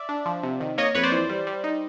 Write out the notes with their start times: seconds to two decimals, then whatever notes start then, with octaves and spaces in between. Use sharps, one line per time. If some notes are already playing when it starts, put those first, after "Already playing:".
Already playing: D5 E5
0.09 D4
0.26 F3
0.43 C3
0.60 D#3
0.78 A#3 C#5 D#5
0.95 F2 B4 C#5
1.03 C5 D5
1.12 E3
1.30 G3
1.47 G3
1.64 D#4